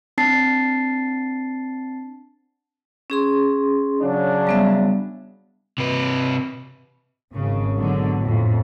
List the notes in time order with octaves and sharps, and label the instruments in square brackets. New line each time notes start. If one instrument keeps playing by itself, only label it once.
[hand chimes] C4 D4 A5 A6 C7
[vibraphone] C#4 G#4 C6
[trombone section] C#3 F#3 D4
[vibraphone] G3 B3 E5
[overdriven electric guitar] C3 B4
[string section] G#1 C#3
G#2 B2 D3 F#3
F2 A2